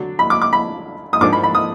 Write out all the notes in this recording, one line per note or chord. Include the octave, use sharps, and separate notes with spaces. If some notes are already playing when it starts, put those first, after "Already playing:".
Already playing: D3 F#3 D4
B5
D6
D6
B5
D#6
G#2 F3 A#3 D4 D6
B5
B5
D#6